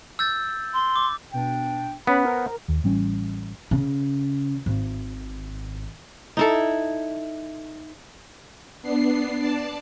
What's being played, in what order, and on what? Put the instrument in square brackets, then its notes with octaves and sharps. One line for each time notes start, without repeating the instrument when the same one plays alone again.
[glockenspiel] E6 G6 A6
[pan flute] C6
[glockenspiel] D6
[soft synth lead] B2 [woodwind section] D4 G5
[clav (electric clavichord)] B3 [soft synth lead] C#4 [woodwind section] B4 B5
[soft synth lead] A#4 [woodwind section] C5 F#5
[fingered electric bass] D#2
A1 G3 C#4
[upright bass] C#3
G#1
[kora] D#4 E4 A4
[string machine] B3 D4 C7
D5 A5